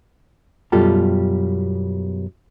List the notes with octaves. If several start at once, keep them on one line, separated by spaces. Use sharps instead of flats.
F#2 B2 G3 F4 G4 A4